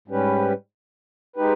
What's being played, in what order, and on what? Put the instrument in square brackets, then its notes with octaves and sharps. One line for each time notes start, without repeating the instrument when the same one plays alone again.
[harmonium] G#2 G3 C#4 G4 B4
G#3 D#4 G4 B4